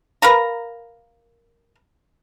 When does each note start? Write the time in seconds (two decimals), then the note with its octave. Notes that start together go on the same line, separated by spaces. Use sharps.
0.22 A#4 B4 F5 A#5